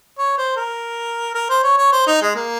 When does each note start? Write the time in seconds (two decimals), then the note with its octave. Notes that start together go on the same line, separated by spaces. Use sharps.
0.18 C#5
0.38 C5
0.57 A#4
1.34 A#4
1.49 C5
1.63 C#5
1.77 C#5
1.92 C5
2.07 D#4
2.22 G#3
2.35 A#3